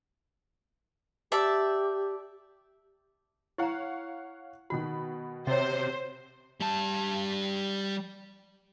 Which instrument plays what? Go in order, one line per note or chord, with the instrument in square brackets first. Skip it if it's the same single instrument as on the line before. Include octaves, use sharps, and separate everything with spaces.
[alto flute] G4 [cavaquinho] D5 E5 A5
[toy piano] E4 A#5 [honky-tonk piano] C#5 F5 F#5
[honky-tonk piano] B2 D#3 B5 [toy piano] F#4
[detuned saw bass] C3 [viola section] C5 [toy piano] C#5 D#5
[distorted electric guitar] G3 A5